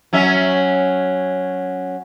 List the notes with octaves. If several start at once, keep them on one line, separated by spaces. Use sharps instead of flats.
F#3 C#4 E5